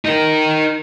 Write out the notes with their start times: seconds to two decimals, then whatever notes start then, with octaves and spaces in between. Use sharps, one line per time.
0.05 D#4 A#4